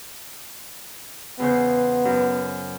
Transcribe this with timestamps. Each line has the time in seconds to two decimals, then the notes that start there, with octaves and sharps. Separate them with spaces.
1.40 E2 C#3 B3 C5
2.05 F#2